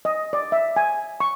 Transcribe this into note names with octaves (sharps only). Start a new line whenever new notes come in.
D#5
D5
E5
G#5
C#6